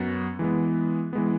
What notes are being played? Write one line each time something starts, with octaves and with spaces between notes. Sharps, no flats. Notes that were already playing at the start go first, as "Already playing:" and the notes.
Already playing: F#2 B3 F#4
E3 G#3 B3
E3 G#3 B3